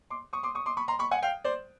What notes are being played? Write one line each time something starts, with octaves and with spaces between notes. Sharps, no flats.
C6 D6
C#6 D#6
C6 D6
C#6 D#6
C6 D6
B5 C#6
A#5 C6
B5 C#6
F#5 G#5
F5 G5
C5 D5